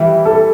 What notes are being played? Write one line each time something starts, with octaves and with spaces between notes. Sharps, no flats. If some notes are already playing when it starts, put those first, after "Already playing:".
Already playing: E3 G3 E4 G4
A4